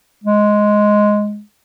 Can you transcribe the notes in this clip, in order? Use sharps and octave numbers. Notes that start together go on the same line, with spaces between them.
G#3